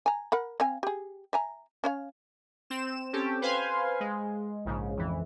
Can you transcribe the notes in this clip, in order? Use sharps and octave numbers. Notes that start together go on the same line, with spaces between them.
G#5 A#5
A#4 F#5 B5
C4 F5 G#5
G4 G#4
E5 G#5 A#5
C#4 C#5 F5
C4 E7
C4 C#4 G4 A4
B4 C5 F5 G#5 C6
G#3
A#1 G#2 C#3
F2 E3